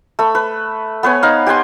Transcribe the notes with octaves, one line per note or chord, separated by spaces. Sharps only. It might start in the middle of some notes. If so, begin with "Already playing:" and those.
A3 B5
B4
B3 B4 C#5 G#5
D#4 F5
G4 F#5 G#5 C6